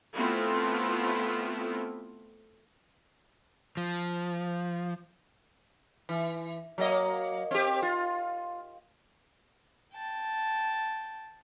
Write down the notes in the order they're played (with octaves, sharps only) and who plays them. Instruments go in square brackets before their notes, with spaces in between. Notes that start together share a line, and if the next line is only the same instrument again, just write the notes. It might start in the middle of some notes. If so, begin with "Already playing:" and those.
[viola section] A3 B3 C4 E4 F4 A4
[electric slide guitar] F3
[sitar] E3
F#3 A#3 D#5
C4 G4
F4
[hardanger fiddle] G5 A5